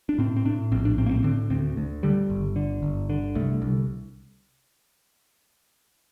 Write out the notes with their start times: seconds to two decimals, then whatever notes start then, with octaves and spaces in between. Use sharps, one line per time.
0.09 D4
0.18 A2 C4
0.36 C4
0.45 A2 D4
0.72 A#1 C4
0.85 D4
0.98 A2 C4
1.06 A#3
1.11 C4
1.24 D3 C4
1.50 D2 C4
1.77 D2
2.03 D3 G3
2.30 G1
2.56 D3
2.83 G1
3.10 D3
3.35 C2 A3
3.62 C2